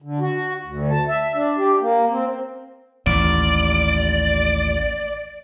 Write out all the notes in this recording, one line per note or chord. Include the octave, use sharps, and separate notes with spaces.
D3
F#4
D2
A5
E5
D4
G4
A#3
C4
A1 D#2 D5